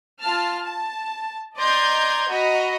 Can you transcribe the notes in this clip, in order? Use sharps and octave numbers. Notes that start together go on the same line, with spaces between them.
F4 A5 F6
A5
D5 D#5 A#5 C6 G6 G#6
F#4 D#5 A#5 B5